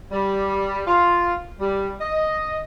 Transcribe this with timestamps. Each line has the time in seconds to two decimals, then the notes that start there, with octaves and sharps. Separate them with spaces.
0.11 G3
0.87 F4
1.60 G3
2.00 D#5